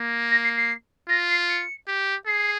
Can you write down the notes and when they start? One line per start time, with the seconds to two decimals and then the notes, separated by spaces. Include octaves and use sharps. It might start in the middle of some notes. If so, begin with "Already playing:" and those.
Already playing: A#3
0.31 A#6
0.44 C7
0.57 C7
1.09 F4 A#6
1.29 C7
1.49 C#7
1.88 G4
2.27 G#4 C7